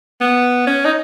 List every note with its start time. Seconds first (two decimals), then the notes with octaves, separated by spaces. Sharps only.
0.21 B3
0.67 C#4
0.85 D#4